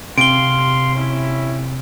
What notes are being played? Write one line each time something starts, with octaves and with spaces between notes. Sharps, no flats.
C3 F5 C6 D7 G7
C#4 E4